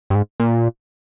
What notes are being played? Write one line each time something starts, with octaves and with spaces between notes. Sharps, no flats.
G2
G#2
A#2